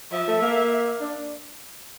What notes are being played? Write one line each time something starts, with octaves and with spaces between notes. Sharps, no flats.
F3 E5
A3
A#3
D4